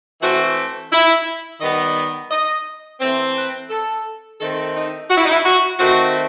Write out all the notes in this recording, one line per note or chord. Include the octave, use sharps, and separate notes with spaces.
E3 A3 C4 F#4
E4
D#3 G3 B3 D#5
D#5
E3 A3 C4
B4
A4
D#3 A3 C4 A4
D#4
F#4
E4
D#4
E4
F#4
D#3 A3 C4 F#4